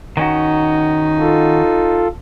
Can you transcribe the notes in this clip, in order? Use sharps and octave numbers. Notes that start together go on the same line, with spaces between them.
D#3 C#4 D#4 F#4
F4 A4